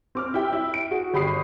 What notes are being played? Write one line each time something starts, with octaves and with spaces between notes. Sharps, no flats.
C4 D6 F6
E4 G4 G5
E4
D7
F#4 G#4
G1 G4 B5 D#6 C7